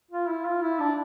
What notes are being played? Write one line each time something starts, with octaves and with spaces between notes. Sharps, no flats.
F4
E4
F4
E4
D4